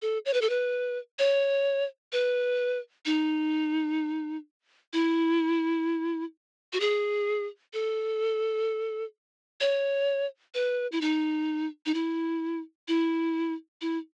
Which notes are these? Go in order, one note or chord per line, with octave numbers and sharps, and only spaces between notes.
A4
C#5
B4
A4
B4
C#5
B4
D#4
E4
F#4
G#4
A4
C#5
B4
E4
D#4
D#4
E4
E4
E4